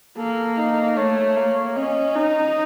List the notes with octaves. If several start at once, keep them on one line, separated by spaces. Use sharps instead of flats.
A#3 A4
D#4
A3 C#5
A#3
C#4 D#5
D#4